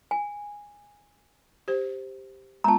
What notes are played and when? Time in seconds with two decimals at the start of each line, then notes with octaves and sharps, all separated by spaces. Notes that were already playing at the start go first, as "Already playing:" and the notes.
0.11 G#5
1.68 G4 C5
2.64 G#3 B3 F4 A5 A#5